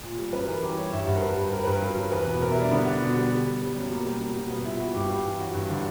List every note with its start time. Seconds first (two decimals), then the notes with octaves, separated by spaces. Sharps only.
0.03 A#2
0.18 G3
0.33 F#2 B4
0.48 E3 A#4
0.62 G3 G4
0.77 G3 C#5
0.93 G2 E5
1.07 G2 F#5
1.16 A#4
1.22 G2 B4
1.37 G3
1.52 G3 A#4
1.64 G2 B4
1.75 A#4
1.81 F#3
1.97 F#3
2.12 E2 B4
2.26 B2
2.42 B2 A#4
2.52 E4
2.56 G3
2.62 D4
2.71 D3 B3
2.87 D3
3.01 B2
3.16 G3
3.31 G3
3.46 G3
3.61 G3
3.76 F#2
3.91 B2 A#3
4.06 G3
4.20 B2
4.35 B2
4.51 G3 B3
4.65 A#2 E4
4.80 G3 F#4
4.95 G2 G4
5.10 G3
5.25 E3
5.40 F#3 F#4
5.55 G2
5.70 D3